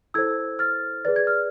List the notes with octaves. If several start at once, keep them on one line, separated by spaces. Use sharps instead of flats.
E4 A4 C5 E6 G#6
F6 A6
G#4 B4 D5 A6
G#6
F6